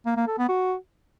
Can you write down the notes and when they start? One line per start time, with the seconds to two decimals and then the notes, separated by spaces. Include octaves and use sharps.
0.06 A#3
0.17 A#3
0.28 A4
0.38 B3
0.49 F#4